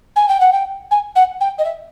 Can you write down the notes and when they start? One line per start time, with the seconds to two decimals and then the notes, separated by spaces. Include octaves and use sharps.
0.16 G#5
0.29 G5
0.40 F#5
0.53 G5
0.91 G#5
1.16 F#5
1.41 G5
1.58 D#5
1.64 E5